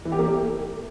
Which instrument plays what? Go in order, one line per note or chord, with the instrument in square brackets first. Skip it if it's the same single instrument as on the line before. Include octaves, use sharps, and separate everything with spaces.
[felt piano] E3
G4
A#3
A3